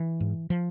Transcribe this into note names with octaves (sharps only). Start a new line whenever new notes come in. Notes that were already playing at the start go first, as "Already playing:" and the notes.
Already playing: E3
G#2
F3